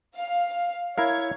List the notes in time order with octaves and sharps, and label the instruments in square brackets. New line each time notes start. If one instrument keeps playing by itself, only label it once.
[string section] F5
[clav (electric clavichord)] E4 A#4 F5 [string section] C#5 G#6